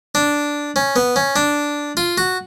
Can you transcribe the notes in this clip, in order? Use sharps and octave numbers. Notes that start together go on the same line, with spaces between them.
D4
C#4
B3
C#4
D4
F4
F#4